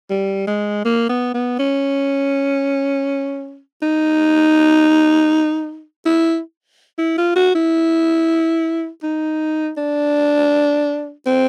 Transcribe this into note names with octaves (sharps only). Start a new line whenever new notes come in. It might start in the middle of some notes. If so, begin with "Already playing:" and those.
G3
G#3
A#3
B3
B3
C#4
D#4
E4
E4
F4
F#4
E4
D#4
D4
C4